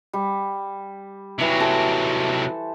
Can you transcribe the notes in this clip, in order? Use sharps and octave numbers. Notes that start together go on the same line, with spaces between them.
G3
C3 E3 F#3 C#5
A4 C5 A5